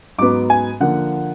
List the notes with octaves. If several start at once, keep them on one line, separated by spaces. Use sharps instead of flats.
G#2 F#3 B3 D6
G#5
D3 F3 A#3 F#5